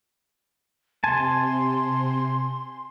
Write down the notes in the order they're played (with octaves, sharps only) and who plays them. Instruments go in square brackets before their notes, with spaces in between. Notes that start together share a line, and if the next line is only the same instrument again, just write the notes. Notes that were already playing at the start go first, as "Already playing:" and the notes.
[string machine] C3 [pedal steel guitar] G#5 A5 [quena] C6